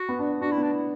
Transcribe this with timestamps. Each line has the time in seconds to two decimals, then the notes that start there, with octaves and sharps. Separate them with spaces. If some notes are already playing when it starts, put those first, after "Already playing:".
Already playing: F#4
0.09 B3
0.19 D4
0.30 D4
0.41 D4 F#4
0.52 E4
0.57 B3
0.63 D4
0.73 E4